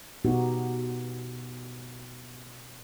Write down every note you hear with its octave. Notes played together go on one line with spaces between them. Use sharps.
B2 B3 D#4 F#4 G4